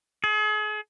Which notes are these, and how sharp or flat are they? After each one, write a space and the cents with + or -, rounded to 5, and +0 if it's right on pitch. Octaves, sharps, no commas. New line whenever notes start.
G#4 +40